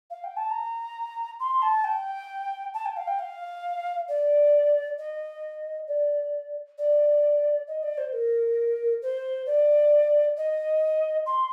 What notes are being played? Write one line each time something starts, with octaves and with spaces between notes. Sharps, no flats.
F5
G5
A5
A#5
C6
A5
G5
A5
G5
F5
G5
F5
D5
D#5
D5
D5
D#5
D5
C5
A#4
C5
D5
D#5
C6